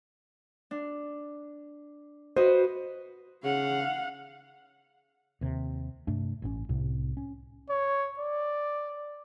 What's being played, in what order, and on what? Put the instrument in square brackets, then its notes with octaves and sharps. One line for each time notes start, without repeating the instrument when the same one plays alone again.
[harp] D4
[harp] F#4 B4 D#5 [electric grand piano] C5
[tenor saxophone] C#3 [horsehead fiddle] F5 F#5
[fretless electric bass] D#2 C3
G2 C3 A3 D4
A1 A2 C4 C#4
C2 A2 C3
C#4
[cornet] C#5
D5